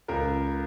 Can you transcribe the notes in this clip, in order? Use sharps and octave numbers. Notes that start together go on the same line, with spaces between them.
C#2 A#4